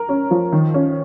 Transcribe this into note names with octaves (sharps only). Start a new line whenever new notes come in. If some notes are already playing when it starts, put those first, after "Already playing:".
Already playing: A#4
C#4
F3
D#3
C#4